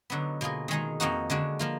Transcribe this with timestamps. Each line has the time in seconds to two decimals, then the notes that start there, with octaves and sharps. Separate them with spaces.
0.10 D3 F#3 B3 D#4 F#4
0.41 B2 A#3 F4 G#4
0.68 D#3 G#3 D#4 G#4
1.00 F2 F3 A#3 D#4 F#4
1.30 D3 G#3 D4 F#4
1.59 F3 A#3 F4